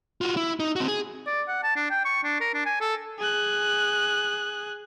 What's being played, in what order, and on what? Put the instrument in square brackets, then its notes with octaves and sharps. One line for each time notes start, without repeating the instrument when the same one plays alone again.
[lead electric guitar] F4 F#4
E4
D#4
C4 F#4
G#4
[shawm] D5
F#5
A5
D4
G5
C#6
D4
A#4
D4
G#5
A4
[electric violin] G#4 F#6